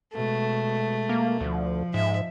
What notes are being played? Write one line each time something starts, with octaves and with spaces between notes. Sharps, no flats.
B2 G#3 A3
A#3
D2 F3
G#2 E5